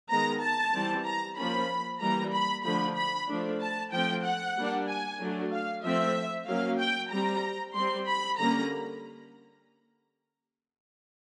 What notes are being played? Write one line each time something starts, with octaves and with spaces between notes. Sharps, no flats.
D#3 G#3 B3 A#5
A5
E3 G3 C4
A#5
F3 A#3 C#4 B5
E3 G3 A#3 A#5
B5
D3 F3 A3 B5
B5
F3 A3 D4
A5
F3 A3 C4 G5
F#5
G3 A#3 D4
G#5
F#3 A3 D4
F5
F3 A3 C4 E5
F#3 A#3 C#4 F5
G5
G3 C4 A#5
G3 C4 C6
B5
D3 G3 A#3 C#4 A#5